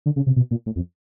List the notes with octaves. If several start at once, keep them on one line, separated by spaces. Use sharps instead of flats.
D3
C#3
C3
B2
A#2
A2
F2